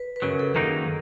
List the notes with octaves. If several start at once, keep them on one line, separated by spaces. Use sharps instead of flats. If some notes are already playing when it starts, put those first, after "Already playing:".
Already playing: B4
B4
F#2 C#3 F#3 A#4
G#4
A4
F#2 D#3 F#3 A#3 D#4 G#4